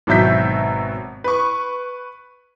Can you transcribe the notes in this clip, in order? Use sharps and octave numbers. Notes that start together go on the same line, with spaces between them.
G#1 B2 F#3 E5 G6 B6
B4 C#6